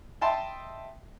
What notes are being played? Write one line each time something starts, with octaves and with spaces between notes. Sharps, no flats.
D#5 E5 G5 A5 B5 C6